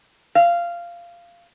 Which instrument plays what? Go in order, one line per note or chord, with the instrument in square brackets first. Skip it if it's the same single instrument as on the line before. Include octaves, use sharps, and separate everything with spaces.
[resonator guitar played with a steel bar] F5